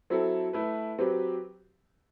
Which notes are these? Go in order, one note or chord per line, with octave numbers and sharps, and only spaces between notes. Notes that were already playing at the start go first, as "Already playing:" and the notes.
F#3 C4 E4 A4
A3 E4 B4
F#3 C4 G4 B4